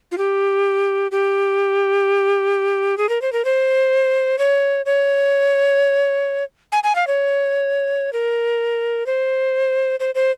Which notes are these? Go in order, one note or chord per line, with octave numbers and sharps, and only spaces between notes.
F4
G4
G4
G#4
A#4
C5
A#4
C5
C#5
C#5
G#5
G#5
F5
C#5
A#4
C5
C5
C5